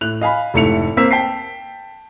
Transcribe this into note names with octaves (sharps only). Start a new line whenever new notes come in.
A2 F#6 F7
D#5 F5 G#5 B5
F1 G#2 A3 E4 C#7 F7
A#3 C4 E6 B6
G5 A5 B6 C7